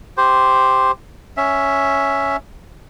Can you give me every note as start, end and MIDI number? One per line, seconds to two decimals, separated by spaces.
0.17 0.91 67
0.17 0.91 72
1.37 2.36 61
1.37 2.36 76